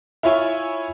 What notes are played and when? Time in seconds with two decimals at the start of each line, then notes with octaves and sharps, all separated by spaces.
0.23 E4 F4 C#5 E5 G#5 C#6